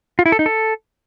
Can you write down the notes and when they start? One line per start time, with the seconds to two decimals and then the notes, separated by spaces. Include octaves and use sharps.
0.19 F4
0.26 E4
0.32 A4
0.39 D#4
0.46 A4